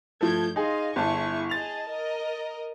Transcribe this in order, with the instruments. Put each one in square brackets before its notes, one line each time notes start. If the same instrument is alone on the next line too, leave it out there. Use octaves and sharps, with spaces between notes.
[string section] G2 G6 G#6 [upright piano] F3 A3 A4
[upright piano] D#4 G#4 [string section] D#5 F5 C6
[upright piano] G1 A5 [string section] E4 G#4 C#6
[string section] G#4 D#5 A5 [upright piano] A6 F7
[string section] A#4 D#5